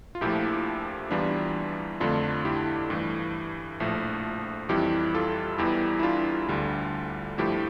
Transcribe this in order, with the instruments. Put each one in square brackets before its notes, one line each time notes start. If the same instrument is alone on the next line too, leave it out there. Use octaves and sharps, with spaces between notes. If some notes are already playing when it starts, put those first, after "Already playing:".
[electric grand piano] F4
A#1 A#2 F3 A3 E4 G4
E2 E3 G3 D4 F4
F2 D3 A3 D4 F4
E4 G4
G2 E3 A3
A#1 A2 F3 A3
F2 E3 G3 E4 G4
F4 A4
E2 E3 G3 E4 G4
E4
D4 F4
D2 D3 G3
G2 F3 A3 E4 G4